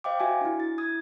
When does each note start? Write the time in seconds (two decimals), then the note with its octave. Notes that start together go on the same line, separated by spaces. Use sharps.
0.04 C5 D#5 F5 G5 D6
0.20 F#4 E5 G#5
0.41 D4 E4
0.60 A6
0.78 E4 D#6 G#6